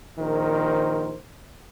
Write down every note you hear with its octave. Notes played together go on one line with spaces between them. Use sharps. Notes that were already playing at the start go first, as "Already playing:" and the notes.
A#1 D#3 A#4 C5